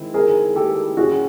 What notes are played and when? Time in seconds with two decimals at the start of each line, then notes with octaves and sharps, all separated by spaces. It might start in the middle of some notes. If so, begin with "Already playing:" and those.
Already playing: D#3 G#3 C4 E4
0.14 G#4 A#4
0.56 G4 A4
0.97 A2 F#3 A#3 C#4 F#4 G#4